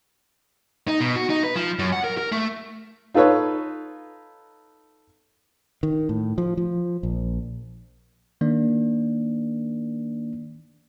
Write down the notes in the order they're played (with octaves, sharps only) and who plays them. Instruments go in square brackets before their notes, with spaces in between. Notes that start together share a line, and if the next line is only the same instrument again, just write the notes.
[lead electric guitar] D#4
B2
F#4
D#4
B4
F3
F#2
F#5
A#4
A#4
A3
[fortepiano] D#4 F4 A4 B4 C#5
[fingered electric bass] D#3
A2
F3
F3
A#1
[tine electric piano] D#3 A#3 D4 D5